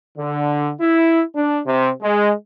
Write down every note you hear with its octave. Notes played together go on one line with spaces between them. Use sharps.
D3
E4
D4
C3
G#3